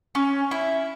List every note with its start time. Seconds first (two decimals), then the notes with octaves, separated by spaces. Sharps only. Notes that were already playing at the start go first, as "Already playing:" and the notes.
0.15 C#4
0.51 E4